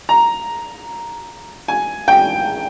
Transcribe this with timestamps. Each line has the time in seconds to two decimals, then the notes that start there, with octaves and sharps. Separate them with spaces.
0.09 A#5
1.68 G#5
2.08 G5